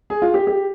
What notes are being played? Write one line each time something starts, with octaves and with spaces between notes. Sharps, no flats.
G#4
F4
G4
G4